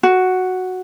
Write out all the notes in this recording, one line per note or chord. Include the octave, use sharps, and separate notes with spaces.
F#4